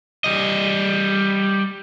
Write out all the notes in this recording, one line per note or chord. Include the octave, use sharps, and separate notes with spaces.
G3 D#5